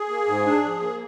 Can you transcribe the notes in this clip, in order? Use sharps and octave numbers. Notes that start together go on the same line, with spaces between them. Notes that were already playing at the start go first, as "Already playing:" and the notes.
Already playing: G#4
A#3
G#2
D4
F3
A#3